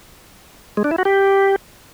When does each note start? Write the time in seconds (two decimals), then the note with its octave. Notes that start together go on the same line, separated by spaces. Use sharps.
0.77 G#3
0.84 D4
0.91 E4
0.98 F#4
1.05 G4